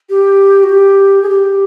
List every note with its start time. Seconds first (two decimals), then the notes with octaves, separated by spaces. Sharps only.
0.10 G4
0.64 F#4
0.69 G4
1.22 G#4
1.29 G4